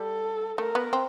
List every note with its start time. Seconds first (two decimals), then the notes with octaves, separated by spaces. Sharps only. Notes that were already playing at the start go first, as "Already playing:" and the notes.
Already playing: G3 A4
0.58 A3 A#4
0.75 B3
0.93 C4